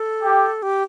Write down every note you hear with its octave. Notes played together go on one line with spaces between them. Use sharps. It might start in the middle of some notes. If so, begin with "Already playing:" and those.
Already playing: A4
G4
G4